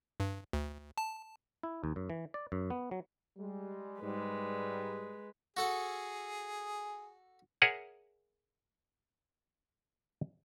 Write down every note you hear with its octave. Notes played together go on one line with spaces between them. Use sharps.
G2
D2
A5
E4
D#2
F#2
E3
D5
F#2
B3
F#3
G3 G#3
G#2 G3 G#3 B4
F#4 G#4 A4 F#5
G#4 A#4 C#5 E5 F#5 G#5